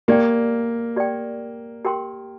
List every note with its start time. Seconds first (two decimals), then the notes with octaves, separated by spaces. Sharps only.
0.08 A#3 G4 D5 G5
0.96 G4 D5 G5
1.85 G4 A#4 G5 C6